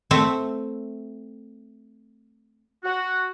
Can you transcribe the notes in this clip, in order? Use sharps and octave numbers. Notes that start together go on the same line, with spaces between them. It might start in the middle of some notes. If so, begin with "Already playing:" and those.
A3 C4 E5
F#4